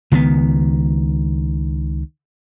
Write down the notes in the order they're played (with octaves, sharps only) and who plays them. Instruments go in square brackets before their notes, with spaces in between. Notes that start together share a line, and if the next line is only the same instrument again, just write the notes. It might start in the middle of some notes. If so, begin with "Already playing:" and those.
[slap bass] C#2 D#3 G3 B3